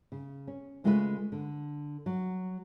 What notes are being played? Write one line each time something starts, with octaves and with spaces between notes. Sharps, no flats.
C#3
C#4
C#3 G#3 A3 F4 F#4 B4
D3
F#3